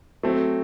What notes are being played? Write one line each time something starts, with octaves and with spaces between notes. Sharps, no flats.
F#3 A3 C4